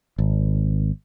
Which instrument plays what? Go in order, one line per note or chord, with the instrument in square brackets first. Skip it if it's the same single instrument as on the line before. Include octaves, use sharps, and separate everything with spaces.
[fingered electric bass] G#1